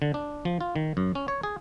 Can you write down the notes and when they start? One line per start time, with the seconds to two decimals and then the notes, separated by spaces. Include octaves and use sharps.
0.02 D3
0.14 D4
0.45 F3
0.61 F4
0.76 D#3
0.97 F#2
1.15 C#4
1.28 C#5
1.43 G#4